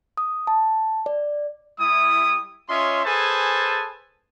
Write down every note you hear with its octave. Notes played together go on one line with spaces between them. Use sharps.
D#6
A5
D5
G3 E4 D#6
C#4 F4 C#5 D#5 E5 C6
G#4 A4 B4 C5 G#5 A5